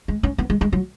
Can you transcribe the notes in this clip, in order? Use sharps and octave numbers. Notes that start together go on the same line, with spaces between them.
G#3
C#4
B3
G#3
G#3
F#3